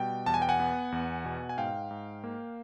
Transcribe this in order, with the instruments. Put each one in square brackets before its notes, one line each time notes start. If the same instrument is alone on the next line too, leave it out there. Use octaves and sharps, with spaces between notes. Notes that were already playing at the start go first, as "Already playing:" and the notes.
Already playing: [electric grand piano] B2 G3 G5
E2 A5
G#5
G5
F#5 G#5
B3
E2
B2
G#5
G#2 F5 G5
G#2
A#3